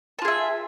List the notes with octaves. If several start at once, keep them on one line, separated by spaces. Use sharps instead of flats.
F4 G#4 E5 A5